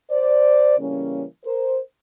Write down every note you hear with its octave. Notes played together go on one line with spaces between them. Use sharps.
C5 D5
C#3 E3 G3 A#3 C#4
A#4 C5